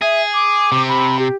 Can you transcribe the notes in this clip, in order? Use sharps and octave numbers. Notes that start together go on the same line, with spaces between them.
G#4 E5
D6
C3
B5
G4